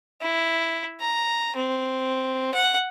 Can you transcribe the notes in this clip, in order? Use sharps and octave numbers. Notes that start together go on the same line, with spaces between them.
E4
A#5
C4
F#5